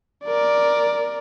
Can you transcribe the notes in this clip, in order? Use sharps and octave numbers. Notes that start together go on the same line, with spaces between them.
A#4 D5